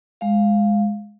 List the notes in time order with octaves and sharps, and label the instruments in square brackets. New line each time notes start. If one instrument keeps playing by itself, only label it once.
[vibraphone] G#3 F5